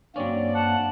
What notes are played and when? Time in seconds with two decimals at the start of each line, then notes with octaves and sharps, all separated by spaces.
0.16 G2 F#3 A#3 C4 C#4 D5
0.54 F#5 A5